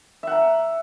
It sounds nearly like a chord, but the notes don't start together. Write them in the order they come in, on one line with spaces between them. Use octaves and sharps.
E5 F#5 A#5